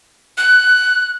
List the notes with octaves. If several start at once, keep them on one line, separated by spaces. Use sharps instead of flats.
F#6